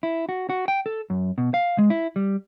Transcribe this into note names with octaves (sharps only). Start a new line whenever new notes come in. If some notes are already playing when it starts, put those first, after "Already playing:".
E4
F#4
F#4
G5
A4
F#2
B2
F5
G#3
E4
G3